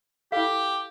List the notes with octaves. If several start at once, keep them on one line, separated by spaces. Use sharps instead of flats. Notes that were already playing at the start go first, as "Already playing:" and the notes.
E4 G4 A4 F5